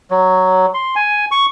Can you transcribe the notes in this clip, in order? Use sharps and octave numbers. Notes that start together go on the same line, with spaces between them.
F#3
C6
G#5
C#6